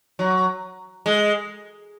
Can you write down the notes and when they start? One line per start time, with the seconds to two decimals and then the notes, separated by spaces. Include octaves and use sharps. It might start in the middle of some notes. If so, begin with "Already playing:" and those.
0.19 F#3
1.06 G#3